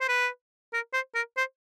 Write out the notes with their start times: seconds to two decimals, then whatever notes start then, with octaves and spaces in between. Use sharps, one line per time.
0.01 C5
0.08 B4
0.73 A#4
0.93 C5
1.15 A#4
1.37 C5